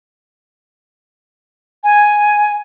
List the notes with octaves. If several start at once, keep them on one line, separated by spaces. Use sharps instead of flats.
G#5